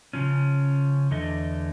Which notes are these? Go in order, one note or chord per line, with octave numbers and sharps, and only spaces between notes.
C#3 F3 C#4
E2 D3 A3 D#5